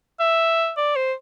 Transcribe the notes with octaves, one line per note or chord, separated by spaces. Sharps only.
E5
D5
C5